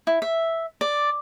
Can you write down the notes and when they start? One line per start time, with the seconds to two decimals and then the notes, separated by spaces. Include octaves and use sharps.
0.07 E4
0.22 E5
0.81 D5